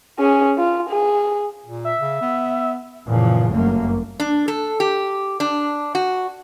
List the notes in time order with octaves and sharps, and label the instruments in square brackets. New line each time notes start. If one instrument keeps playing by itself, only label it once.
[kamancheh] C#4 G#4
F4
G#4
[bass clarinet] A#2
[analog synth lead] E5
[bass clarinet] C#3
B3
[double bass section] F#1 A#2 C#3 E3 F3
G1 F#2 A3 A#3
[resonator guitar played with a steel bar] D4
A4
G4
D4
F#4